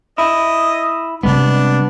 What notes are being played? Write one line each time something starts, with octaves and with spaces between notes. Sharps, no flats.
E4 D#5
C3 G3 G#3 B3 D4